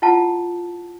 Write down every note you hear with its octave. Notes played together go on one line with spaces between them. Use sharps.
E4 F4 F#5 A5